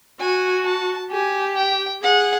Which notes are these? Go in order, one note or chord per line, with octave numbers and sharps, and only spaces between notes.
F#4 G#5
A5
G4 G#5
G5
G#4 F#5